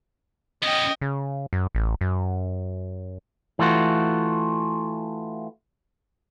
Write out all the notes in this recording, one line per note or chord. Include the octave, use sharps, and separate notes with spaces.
B3 C#4 D#5 G5
C#3
F#2
A1
F#2
E3 A3 F4 F#4